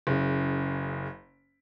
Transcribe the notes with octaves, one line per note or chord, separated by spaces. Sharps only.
F#1 C#3